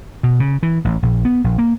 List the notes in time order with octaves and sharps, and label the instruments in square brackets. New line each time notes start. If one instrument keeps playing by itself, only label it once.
[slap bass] B2
C#3
E3
A1
A#1
B3
A#1
A#3